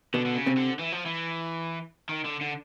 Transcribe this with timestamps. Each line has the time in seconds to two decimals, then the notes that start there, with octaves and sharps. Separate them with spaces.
0.14 B2 D3 B3
0.26 D3
0.36 C#3
0.46 C3 C4
0.57 D3
0.79 E3
0.92 F3
1.06 E3
2.09 D#3
2.25 D3
2.41 D3